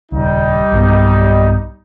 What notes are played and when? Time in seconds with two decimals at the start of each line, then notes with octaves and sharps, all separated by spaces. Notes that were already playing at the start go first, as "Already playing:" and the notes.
0.12 D#1 C#2 G3 D#4
0.72 B1 G2 B3